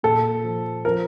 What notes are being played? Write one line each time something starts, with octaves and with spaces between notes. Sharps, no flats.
A#2 A4
F3
F3 A#4